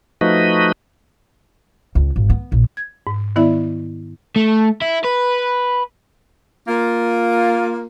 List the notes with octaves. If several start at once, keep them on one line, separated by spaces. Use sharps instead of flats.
F3 A3 D#4 F#4 B4 D#5
C#2
G#1
B3
A#1
G#6
G#2
D#3 B3 E4 D5 E5
A3
E4
B4
A#3 F4